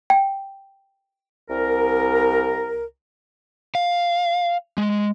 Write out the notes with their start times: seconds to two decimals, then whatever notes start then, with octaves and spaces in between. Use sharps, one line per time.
0.10 G5
1.48 C2 A#4
3.75 F5
4.78 G#3